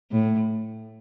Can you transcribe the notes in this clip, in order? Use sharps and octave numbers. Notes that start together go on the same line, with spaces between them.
A2